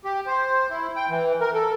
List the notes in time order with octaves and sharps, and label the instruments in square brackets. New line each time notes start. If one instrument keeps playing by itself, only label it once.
[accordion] G4
C5
E4
G5
E3
A#4
A4